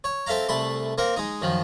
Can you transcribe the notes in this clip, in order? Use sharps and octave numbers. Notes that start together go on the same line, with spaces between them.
C#5
C4 A4 E5 F5 A#5
C2 A3 B5 C6
A#3 C4 A#4
G#3 D#4
F#2 D#3 F3